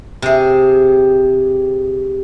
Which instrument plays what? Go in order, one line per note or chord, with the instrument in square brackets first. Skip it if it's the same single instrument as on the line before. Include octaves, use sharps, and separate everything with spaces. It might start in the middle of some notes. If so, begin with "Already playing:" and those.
[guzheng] C3 G#4